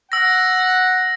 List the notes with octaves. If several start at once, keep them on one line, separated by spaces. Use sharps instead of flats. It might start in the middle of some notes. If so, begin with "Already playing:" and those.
F#5 E6 A#6